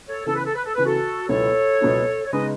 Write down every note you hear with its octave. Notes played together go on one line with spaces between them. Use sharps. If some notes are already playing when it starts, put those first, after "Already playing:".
A4 C#5
C#3 E3 B3 A4
B4
A4
B4
A4
C#3 E3 B3 B4
F#4 A4
C#2 B2 F#3 B3 E4 A4 C#5
C#2 B2 F#3 B3 E4
C#5
C#3 G#3 B3 D#4 B4 D#5